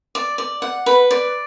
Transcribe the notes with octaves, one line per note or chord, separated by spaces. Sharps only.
D5
D5
F#5
B4
D5